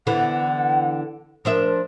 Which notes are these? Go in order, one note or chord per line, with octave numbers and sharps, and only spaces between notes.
D3 E3 B3 F#5
F3 D4 A#4 E5